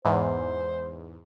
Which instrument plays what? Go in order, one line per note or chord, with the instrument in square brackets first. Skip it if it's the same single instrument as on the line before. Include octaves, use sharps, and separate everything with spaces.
[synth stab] E2 G#2 [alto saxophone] C5